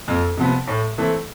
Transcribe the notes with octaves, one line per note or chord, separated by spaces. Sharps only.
F2
C3 F3 B3
A2
E3 A3 C4